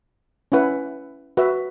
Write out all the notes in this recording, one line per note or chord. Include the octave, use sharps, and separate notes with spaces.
C#4 E4 B4 F#5
F#4 B4 E5